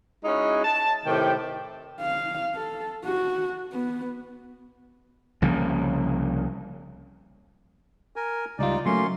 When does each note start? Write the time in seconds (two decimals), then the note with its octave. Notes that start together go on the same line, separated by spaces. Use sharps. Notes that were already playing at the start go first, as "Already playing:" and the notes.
0.25 G#3 C#4 D#4 E4 F#4 G#4
0.64 A5
1.06 A2 C3 D#3 G4 G5
2.01 F5
2.55 A4
3.05 F#4
3.72 B3
5.42 C2 C#3 F3 A#3
8.16 A#4 G#5
8.59 C#2 G3 D#4 F4 D5
8.85 F#3 A3 A#3 C#4 C6